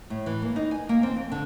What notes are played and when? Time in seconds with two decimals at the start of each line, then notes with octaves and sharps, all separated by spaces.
0.10 A2
0.26 E3
0.42 A#3
0.56 D#4
0.71 G#5
0.89 A#3
1.03 C4
1.17 F2
1.32 D3